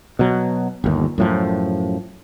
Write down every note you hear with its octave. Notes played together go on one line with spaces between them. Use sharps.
B2 F#3
G1 D#2
F#2 A2 F3